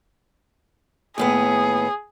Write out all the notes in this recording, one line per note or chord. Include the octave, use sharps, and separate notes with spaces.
D#2 A2 B3 G#4